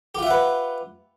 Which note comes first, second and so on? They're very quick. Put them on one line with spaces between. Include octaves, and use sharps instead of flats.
G4 F4 E5 F#5 B4